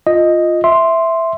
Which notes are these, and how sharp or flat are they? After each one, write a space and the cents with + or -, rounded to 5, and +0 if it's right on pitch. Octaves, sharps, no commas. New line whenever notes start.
F4 +0 D#5 +0
E5 +0 C6 +0